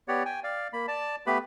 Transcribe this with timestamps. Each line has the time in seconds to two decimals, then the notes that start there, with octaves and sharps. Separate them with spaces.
0.08 B3 G4 C#5 D5 F#5
0.25 G5 G#5
0.44 D5 F5
0.73 A#3 B5
0.88 D5 A5
1.27 A3 B3 G4 B4 B5